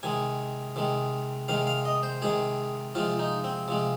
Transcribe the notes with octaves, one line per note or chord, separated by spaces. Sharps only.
C3 D#3 G#3 G#5
C3 D#3 G#3
C3 D#3 G#3 F5
F5
D#5
C5
C3 D#3 G#3 G#4
C3 F3 G#3 F4
D#4
C4
C3 F3 G#3